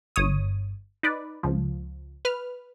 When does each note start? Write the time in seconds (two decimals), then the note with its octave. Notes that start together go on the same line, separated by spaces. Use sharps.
0.16 G1 C#5 D#6
1.03 D#4 B4 D5
1.43 C#2 F3
2.25 B4 F6